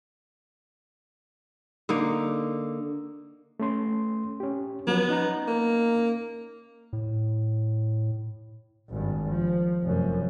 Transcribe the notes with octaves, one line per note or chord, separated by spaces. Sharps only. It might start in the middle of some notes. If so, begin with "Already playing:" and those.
D3 A#3 D#4
A3 C#4 C6
C#4 G4
F3 F#3 B3
C#4 D#4 A#5
A#3
A2
G#1 G2
F3
F1 F#2